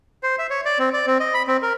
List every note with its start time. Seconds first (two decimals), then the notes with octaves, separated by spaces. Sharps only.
0.23 C5
0.39 E5
0.50 C#5
0.65 D5
0.79 C4
0.93 D5
1.07 C4
1.20 D#5
1.34 B5
1.47 C4
1.63 A#4